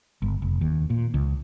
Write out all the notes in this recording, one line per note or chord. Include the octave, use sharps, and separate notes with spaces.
G1
F1
D#2
A#2
C#2